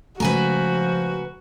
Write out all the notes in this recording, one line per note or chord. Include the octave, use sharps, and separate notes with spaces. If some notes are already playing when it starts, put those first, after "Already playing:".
C#3 F3 G#3 A3 F#4 B4 G#5 A#5